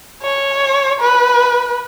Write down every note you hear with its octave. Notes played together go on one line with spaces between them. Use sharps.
C#5
B4